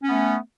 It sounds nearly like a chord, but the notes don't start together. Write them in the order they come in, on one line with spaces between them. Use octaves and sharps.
C#4 B3 A3